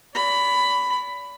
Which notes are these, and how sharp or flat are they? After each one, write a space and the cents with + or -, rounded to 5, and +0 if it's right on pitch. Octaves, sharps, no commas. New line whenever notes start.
D5 -40 B5 +10